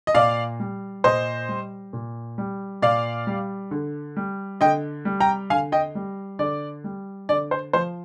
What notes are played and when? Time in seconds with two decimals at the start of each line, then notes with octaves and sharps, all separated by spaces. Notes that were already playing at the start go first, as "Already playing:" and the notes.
0.07 D#5
0.14 A#2 D5 F5
0.60 G3
1.04 A#2 C5 D#5
1.49 G3
1.93 A#2
2.38 G3
2.82 A#2 D5 F5
3.27 G3
3.71 D3
4.16 G3
4.61 D3 D#5 G5
5.05 G3
5.20 G5 A#5
5.50 D3 F5 G#5
5.72 D#5 G5
5.95 G3
6.39 D3 D5
6.84 G3
7.29 D3 D5
7.51 C5
7.73 F3 C5